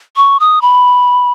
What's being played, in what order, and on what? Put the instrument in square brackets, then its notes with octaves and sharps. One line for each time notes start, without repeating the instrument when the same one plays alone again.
[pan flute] C#6
D#6
B5